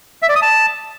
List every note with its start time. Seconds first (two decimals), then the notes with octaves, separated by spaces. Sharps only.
0.22 E5
0.29 D5
0.36 D#6
0.42 A5